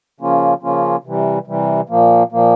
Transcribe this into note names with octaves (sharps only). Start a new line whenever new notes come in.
C#3 F3 A#3 C#4 F4
C#3 F3 A#3 C#4 F4
C3 E3 G3
C3 E3 G3
A#2 F3 A#3
A#2 F3 A#3